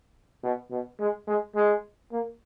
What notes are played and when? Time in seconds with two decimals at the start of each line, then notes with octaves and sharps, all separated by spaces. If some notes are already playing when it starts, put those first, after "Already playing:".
0.43 B2
0.71 B2
1.00 G#3
1.27 G#3
1.55 G#3
2.12 A#3